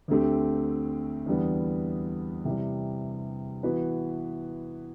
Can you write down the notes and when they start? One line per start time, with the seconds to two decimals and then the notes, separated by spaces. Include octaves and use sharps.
0.08 D2 D3 A3 C4 G4
1.26 E2 D3 G3 B3
2.45 C3 E3 G3
3.63 E3 B3 F#4 B4